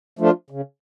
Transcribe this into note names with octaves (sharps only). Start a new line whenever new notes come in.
F3 A3 D4 F4
C#3